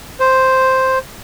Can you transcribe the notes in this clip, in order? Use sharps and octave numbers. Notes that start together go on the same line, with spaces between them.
C5